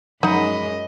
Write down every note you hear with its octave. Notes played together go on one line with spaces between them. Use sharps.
F#2 F3 F#3 G#3 D#4 D#5 F#5 B5